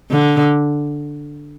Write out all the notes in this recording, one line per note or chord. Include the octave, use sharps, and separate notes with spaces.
D3